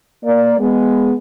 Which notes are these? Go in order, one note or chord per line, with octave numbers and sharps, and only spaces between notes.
A#3 D5
G#3 B3